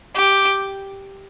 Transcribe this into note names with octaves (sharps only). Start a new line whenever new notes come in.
G4